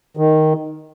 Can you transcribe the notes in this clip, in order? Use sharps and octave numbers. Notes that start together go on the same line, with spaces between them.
D#3